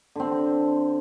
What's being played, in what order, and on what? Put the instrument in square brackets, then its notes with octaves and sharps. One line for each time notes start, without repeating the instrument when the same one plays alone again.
[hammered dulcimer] D3 C4